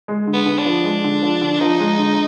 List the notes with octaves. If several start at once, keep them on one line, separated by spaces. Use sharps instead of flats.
G#3
D3
B3
D3
D4
F3
G#3
D3
F3
D3
F3 D#4
G#3
D3